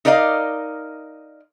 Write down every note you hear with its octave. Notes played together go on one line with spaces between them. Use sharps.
D#4 A#4 D5 D#5 F5